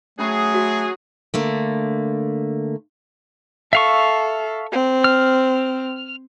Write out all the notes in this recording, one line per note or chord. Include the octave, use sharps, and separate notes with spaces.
F#3 A3 C#4 G#4 B5
F#4
D3 A3 A#3
A4 E5 F5 C#6
C4
F6